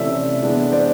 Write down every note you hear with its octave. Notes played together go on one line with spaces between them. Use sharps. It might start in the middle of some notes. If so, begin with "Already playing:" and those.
Already playing: C3 E3 A3 C#4 D5 E5
E3 G#3 B3 D4
C5 D5